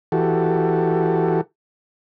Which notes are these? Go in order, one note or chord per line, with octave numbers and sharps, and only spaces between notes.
E3 F#4 G4 A4